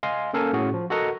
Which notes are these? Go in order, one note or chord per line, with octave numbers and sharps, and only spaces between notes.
D#5 F5 G#5 C6
A#3 C#4 A4 A#4 F5 G#5
A2 C#4 F#4 G#4
F3
F#4 A4 A#4 D#5 F#5 A#5